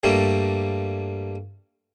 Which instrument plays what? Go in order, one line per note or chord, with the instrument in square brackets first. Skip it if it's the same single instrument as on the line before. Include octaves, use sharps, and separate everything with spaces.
[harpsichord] G2 G3 A3 A#3